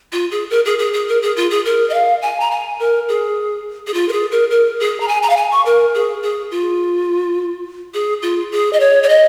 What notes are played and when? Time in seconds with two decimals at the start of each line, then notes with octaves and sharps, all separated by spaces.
0.12 F4
0.31 G#4
0.50 A#4
0.66 G#4
0.79 G#4
0.93 G#4
1.08 A#4
1.22 G#4
1.37 F4
1.51 G#4
1.65 A#4
1.90 D#5
1.94 F5
2.22 G#5
2.40 A#5
2.51 G#5
2.79 A#4
3.09 G#4
3.87 G#4
3.94 F4
4.09 A#4
4.13 G#4
4.32 A#4
4.51 A#4
4.80 G#4
5.00 A#5
5.08 G#5
5.23 A#5
5.30 F5
5.37 G#5
5.52 C#6
5.66 A#4
5.95 G#4
6.23 G#4
6.51 F4
7.94 G#4
8.23 F4
8.52 G#4
8.73 D#5
8.80 C#5
9.03 C#5
9.09 D#5